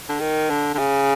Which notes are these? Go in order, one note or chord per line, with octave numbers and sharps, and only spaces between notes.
D3
D#3
D3
D3
C#3